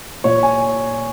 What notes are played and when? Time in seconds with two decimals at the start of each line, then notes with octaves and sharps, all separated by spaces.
0.24 A#2 C#5
0.43 G#5